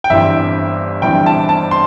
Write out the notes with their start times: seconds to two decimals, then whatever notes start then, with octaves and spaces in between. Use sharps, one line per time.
0.04 G5
0.10 G1 G2 E3 C4 E5
1.02 G1 G2 E3 C4 G5
1.26 A5
1.49 A5
1.71 C6